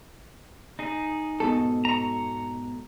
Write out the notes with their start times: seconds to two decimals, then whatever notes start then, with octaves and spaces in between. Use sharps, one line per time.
0.79 D#4 G#4
1.40 G#2 B2 A4
1.85 A#5 C#6